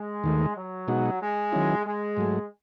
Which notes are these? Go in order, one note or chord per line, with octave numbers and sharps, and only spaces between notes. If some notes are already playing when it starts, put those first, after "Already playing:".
Already playing: G#3
D#2 D#3 A3
F#3
B2 G#3 D#4 F#4
G#3
D#3 F#3 C#4 E4
G#3
G#2 F#3 A3